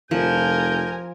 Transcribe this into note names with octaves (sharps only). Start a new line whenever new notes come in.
F1 F3 A#4 G#5 G6